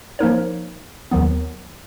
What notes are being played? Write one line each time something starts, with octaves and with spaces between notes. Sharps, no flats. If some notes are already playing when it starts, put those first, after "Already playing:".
F3 A#3 D#4 A#4 C#5
D#2 D#3 F#3 B3